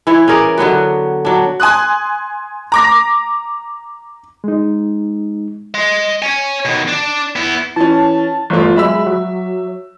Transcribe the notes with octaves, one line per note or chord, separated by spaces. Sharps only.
E3 E4 C#5
C#4 G#4 A#4 D5
D3 F#3 B3 F#4
F#3 D4
G#5 C6 D#6 F#6
A#5 D6 A#6
G#3 D#4
D#5 C6
C#5 G#5
B2 D#3
D4
B3 E4
E3 C#4 A5
G1 E3 F3 A3 F4
F#3 G#3 E5 B5 E6
F#3